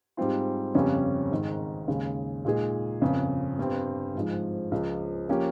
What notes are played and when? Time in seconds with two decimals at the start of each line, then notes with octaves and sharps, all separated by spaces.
0.17 G#2 G3 C4 F4
0.75 G1 F2 C#3 G3 C#4
1.31 G#1 G#2 D#3
1.88 D#2 C#3 G#3
2.45 A#2 G#3 D#4 G#4
3.01 G1 F2 C#3
3.58 G1 G2 G3 C4
4.15 G#1 G#2 F3 G#3
4.71 C#2 C#3 F3
5.29 F3 A#3 C#4 G4